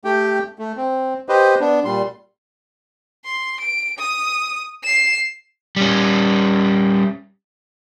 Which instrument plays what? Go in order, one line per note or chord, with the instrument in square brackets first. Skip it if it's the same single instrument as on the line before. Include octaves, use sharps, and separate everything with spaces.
[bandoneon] A3 G4 G5
A3
C4
G4 B4 C5 D#5
B3 D4
A#2 G3 C6
[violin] C6
D7
D#6
C7 E7
[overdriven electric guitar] G3 C#4